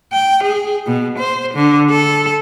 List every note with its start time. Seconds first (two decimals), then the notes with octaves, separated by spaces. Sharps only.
0.13 G5
0.44 G#4
0.86 B2
1.18 C5
1.54 D3
1.90 A4